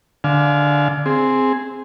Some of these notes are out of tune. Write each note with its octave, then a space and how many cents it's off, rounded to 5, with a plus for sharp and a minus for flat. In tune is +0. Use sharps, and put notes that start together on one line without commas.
D3 +0 F5 +0 G#5 +35
C4 +0 G#4 +0